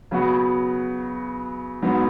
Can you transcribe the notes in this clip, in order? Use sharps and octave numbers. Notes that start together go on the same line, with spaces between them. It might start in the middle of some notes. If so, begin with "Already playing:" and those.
C#3 F#3 B3 F#4
G#2 F#3 B3